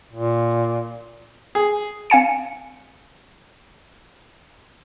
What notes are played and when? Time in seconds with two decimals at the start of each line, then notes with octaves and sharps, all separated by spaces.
0.13 A#2
1.55 G#4
2.10 C4 F5 G#5 C#7